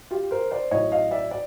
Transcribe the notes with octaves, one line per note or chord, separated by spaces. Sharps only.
F4 G4
A#4 C5
C5 D5
A1 A2 F#3 C#5 D#5
D#5 F5
D5 E5
D5